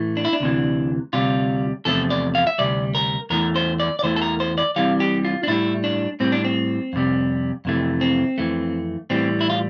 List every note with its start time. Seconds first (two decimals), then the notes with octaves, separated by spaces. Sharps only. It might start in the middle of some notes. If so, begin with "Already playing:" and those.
Already playing: A2 E3 A3
0.17 D4
0.25 E4
0.33 D4
0.40 D2 C3 E3
1.13 D2 C3 G3 F4
1.85 E2 C3 F3 A3 A4
2.10 D5
2.35 F5
2.47 E5
2.58 D2 C3 G3 D5
2.95 A#4
3.30 E2 E3 A3 A#4
3.56 C5
3.80 D5
3.99 D5
4.03 E2 E3 A3 C5
4.16 A4
4.22 A#4
4.40 C5
4.58 D5
4.76 C2 C3 E3 G3 F5
5.00 G4
5.25 F4
5.43 D4
5.47 A2 G3 E4
5.84 D4
6.20 A2 G3 C4
6.32 D4
6.45 C4
6.93 F2 C3 G3
7.65 F2 C3 E3 A3
8.01 C4
8.38 F2 E3 A3
9.10 A2 E3 G3 C4
9.41 E4
9.50 F4